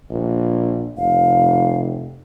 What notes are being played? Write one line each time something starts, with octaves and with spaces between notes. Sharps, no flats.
A#1
F1 F5